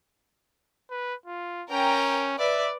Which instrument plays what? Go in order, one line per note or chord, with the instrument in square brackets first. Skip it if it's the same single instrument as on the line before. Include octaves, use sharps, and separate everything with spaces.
[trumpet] B4
F4
[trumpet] C#4 [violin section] A#4 G5 A#5
[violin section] B4 D5 [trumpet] E5